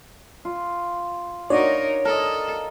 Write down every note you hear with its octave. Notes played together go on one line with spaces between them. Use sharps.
F4
D4 D#4 F#4 A#4 C#5
A4 A#4 D#5